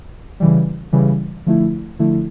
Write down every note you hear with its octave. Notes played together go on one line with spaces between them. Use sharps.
C#3 E3 G3
C#3 E3 G3
D3 F3 A3 E4
D3 F3 A3 E4